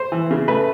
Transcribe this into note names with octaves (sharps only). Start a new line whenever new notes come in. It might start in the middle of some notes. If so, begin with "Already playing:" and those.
Already playing: C5
E3
C#3
A3 B4